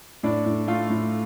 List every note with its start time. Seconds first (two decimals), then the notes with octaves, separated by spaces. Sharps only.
0.23 A2 D4 D5
0.46 A2
0.68 A3 F4 F5
0.90 A2